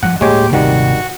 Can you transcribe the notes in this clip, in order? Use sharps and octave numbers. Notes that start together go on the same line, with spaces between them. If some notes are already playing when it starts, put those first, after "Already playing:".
G2 F3 F#5
D2 A2 G#3 A#3 G4 C#5
D#1 G#1 C3 D#3 G3 F#4